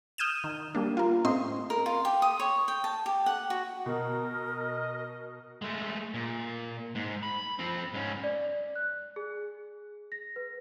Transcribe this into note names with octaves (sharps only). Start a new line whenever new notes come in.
D#6 F6 G6 G#6 D#7 E7
D#3
G3 A#3 D4
F4 A#4
A2 C4 C#4 D#5 C6
A#4
F4
G4
D#6
C#5
G5
A5
G4
F#5
F#4
B2 A#4 D#5
G#3 A3
A#2
G#2
B5
F3 C4
G#2 C#4
D5
F#6
G#4
A#6
B4